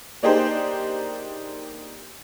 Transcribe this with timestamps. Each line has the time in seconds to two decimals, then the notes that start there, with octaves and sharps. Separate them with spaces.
0.23 A#3 D4 D#4 G4 G#4 C5